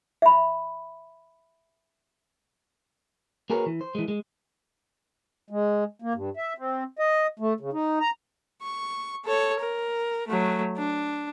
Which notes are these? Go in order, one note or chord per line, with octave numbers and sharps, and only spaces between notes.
E5 B5
A#3 F#4 G#4 A#4 B4 C#5
E3
C5
E3 G#3
G#3
G#3
A#3
G2
E5
C4
D#5
A3
C#3
D#4
A#5
C#6
A4 C#5
A#4
F#3 A3
D4